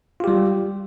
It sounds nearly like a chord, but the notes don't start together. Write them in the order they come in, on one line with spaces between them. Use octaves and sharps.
F4 G4 G3